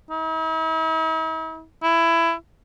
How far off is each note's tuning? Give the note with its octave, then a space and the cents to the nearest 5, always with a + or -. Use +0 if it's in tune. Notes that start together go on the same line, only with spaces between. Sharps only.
E4 -45
E4 +15